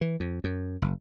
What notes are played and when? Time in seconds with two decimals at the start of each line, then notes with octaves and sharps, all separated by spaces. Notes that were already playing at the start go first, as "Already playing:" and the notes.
0.01 E3
0.20 F2
0.44 F#2
0.82 F#1